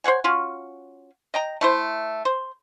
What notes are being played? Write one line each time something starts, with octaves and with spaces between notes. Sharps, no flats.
C5 C#5 F#5 G#5
C#4 F4 F#4
D#5 G5 A#5
A3 E4 C5
C5